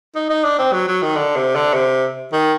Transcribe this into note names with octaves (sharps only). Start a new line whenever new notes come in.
D#4
D#4
D4
C4
F#3
F#3
D#3
D3
C3
D3
C3
D#3